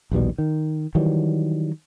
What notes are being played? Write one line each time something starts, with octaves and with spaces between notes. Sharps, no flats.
A#1 D#2 B2 G3
D#3
D#3 E3 F#3 G3